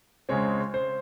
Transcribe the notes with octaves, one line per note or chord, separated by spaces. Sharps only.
C#2 C#3 G#3 C4 C#5
C5